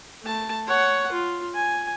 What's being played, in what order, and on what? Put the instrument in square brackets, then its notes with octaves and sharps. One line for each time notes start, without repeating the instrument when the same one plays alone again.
[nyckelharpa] A3 A5
C#5 F#5
F4
G#5